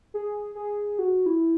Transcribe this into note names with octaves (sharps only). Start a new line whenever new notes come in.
G#4
G#4
F#4
E4